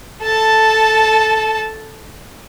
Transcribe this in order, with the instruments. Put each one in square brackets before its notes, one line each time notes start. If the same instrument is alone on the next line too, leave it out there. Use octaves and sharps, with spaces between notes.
[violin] A4 A5